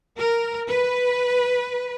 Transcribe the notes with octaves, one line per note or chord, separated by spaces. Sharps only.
A#4
B4